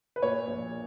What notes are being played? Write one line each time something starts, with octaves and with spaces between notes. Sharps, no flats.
B4
A#2 C#5
A#1